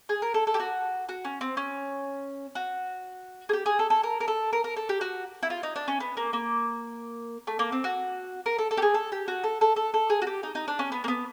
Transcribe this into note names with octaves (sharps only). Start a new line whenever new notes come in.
G#4
A#4
A4
A4
G4
F#4
F#4
C#4
C4
C#4
F#4
G#4
G4
G#4
A4
A4
A#4
A#4
A4
A#4
A#4
A4
G4
F#4
E4
F4
D#4
D4
C#4
B3
A#3
A#3
A3
A#3
C4
F#4
A#4
A4
A4
G4
G#4
A4
G4
F#4
A4
A4
A4
A4
G#4
F#4
G4
D#4
D#4
D4
C#4
B3
A#3
B3